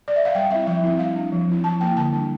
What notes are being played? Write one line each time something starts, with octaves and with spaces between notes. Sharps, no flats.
D5
E5
F5
G3 G5
C4 E4 E5
F3 E5
C4 E4
G3 F5
D4
F3
C4 E4
F3 A5
A#3 E4 G5
D3 A5
G3 D4